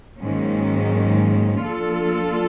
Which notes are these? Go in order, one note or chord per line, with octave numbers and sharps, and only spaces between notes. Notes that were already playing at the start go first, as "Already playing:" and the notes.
G#2 D#3 F#3 A#3 C#4
F3 A#3 D4 F4 A4